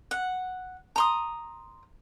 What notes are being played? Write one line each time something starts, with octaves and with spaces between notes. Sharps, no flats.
F#5
A#5 C6 D#6